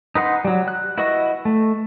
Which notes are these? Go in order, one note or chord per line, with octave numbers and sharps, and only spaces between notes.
D#4 B4 F#5 C6
F#3 G3
F#6
E4 F#4 B4 D#5 C#6
A3